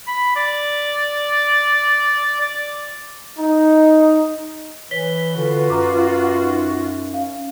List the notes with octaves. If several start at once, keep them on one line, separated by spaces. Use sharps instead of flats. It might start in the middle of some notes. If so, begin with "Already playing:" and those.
B5
D5
D5
D#4
E3 B4 C#5 B6 G7
D3 F4 F#4
F#2 A#5 C6 D6
D#4
C#4 F5